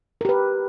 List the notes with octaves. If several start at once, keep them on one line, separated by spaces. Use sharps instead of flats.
G4 A#4 B4